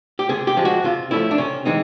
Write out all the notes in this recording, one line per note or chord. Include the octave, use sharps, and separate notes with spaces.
G4
C3 G#4
G4
F3 G#3
F#4
C3 F4
F3 A3 C#4 E4
D4
C3 C#4
E3 G#3 C4 D#4